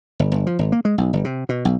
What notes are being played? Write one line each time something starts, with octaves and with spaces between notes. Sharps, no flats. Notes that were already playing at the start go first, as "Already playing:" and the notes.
G1
G1
F3
G#1
A#3
G#3
B1
G1
C3
B2
B1